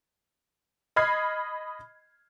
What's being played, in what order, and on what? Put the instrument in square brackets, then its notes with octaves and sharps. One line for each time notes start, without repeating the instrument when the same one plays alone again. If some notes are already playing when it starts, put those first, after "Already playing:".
[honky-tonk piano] D#5 B5 F6 G#6 C7